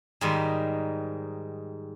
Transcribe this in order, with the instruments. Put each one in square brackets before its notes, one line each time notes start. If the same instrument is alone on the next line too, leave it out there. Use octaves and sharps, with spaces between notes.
[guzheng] G#2 D#3 G3